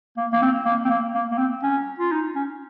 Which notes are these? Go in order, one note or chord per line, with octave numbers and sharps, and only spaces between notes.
A#3
A#3
C4
A#3
C4
A#3
A#3
A#3
C4
C#4
F4
D#4
C#4